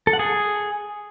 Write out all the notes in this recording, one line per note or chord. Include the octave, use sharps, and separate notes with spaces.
A4
F#5
G#4